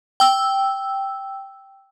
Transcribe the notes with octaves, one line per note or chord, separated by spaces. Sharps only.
G5 E6